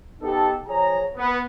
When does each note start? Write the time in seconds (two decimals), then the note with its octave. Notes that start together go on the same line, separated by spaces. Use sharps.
0.22 B3 D#4 G4 A4
0.68 F3 G#4 C#5 A#5
1.16 B3